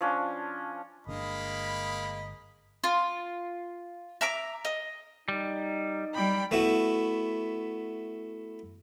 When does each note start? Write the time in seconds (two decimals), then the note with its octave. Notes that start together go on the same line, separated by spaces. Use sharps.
0.01 F3 C#4 D4
1.07 G1 C#3 G#3 A#3 D4 D#5 B5
2.84 F4
4.21 E5 A#5 D6
4.65 D#5
5.28 G3 D#4
6.15 G3 G5 B5
6.51 A3 B3 E4 F#4